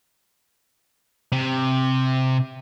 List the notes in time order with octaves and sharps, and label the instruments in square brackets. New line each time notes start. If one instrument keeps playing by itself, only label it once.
[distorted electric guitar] C3